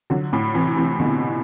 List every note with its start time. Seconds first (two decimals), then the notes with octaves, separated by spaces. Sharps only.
0.10 D3 F#3
0.33 A2
0.54 C3 E3
0.77 C3 E3
1.00 B2 D3